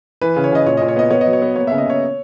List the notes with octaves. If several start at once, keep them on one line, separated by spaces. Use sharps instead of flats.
E3 B4
C#3
C#5
C#3 D#5
A#2 C#5
A#2 D#5
C#5
B3 D#5
B3 C#5
D#5
F#3
C#5
B3
A#3 C#5
E5
C#3
D#5
C#3 C#5